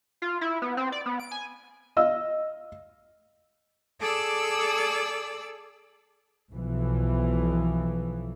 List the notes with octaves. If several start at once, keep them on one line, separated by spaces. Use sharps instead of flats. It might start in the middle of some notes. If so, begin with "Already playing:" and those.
F4
E4
B3
C4
D5
B3
D7
G#5
D#5 F5 E6
G#4 A4 D5 D6 E6
B1 E3 F3